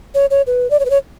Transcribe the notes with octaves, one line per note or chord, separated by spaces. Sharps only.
C#5
C#5
B4
D5
C#5
B4
C#5